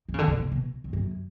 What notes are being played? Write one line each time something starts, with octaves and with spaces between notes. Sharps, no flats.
D#3
C#3
D3
C#3
C3
B2
G2
F#2